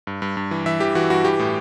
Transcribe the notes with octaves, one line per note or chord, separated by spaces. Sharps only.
G2
G2
G2
E3
E3 E5
E3 G4
E3 F#4
G2 F#4
E3 G4
A2